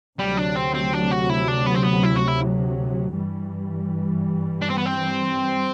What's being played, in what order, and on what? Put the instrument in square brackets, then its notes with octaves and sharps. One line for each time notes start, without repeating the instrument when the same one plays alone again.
[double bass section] D2 C3 F#3 [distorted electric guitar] G3
[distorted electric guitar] D4
C4
C4
D4
F#4
E4
D4
B3
C4
B3
E4
F#4
E4
[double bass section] G2 E3 G3
[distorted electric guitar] D4
C4
B3
C4